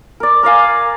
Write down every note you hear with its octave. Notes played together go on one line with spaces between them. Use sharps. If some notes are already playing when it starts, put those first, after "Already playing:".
A#4 D5
A#4 D5 F5 G#5